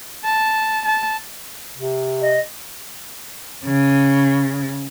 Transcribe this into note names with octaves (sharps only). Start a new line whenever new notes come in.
A5
A5
C3
D#5
C#3